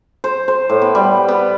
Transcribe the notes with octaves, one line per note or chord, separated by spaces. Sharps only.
C5
C5
A2
B3
G3
B3